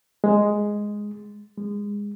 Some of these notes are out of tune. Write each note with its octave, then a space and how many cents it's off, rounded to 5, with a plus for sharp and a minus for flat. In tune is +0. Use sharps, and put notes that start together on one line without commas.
G#3 +0
G#3 -20